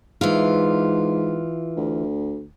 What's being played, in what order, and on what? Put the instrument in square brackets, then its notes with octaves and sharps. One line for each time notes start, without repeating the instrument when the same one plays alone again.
[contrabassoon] G#2 [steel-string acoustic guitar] E3 F4
[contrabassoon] D2